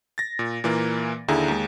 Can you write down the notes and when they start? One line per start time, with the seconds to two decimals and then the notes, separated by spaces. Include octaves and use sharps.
0.18 A6 A#6
0.39 A#2
0.64 A#2 E3 A#3
1.28 D#2 D3 E4 G#4 A#5
1.48 D#2 G#3